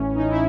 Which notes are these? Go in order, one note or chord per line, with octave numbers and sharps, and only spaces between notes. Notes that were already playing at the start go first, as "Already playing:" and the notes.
Already playing: A1 A2 E3 C#4
D#4
E4